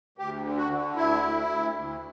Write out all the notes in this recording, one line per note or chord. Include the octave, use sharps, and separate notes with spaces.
D2 G4
D3
F#4
D3
D2 E4
D2
D2
D2